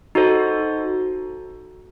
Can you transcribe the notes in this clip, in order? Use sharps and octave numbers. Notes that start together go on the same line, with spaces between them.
D#4 F#4 A4 C5